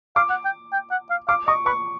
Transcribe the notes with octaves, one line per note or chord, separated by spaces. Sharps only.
F5 D6
F#5
G5
G5
F#5
F5
F5 D6
D#5 C#6
B4 C#6